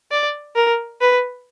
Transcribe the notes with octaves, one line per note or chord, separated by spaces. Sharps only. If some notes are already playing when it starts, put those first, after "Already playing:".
D5
A#4
B4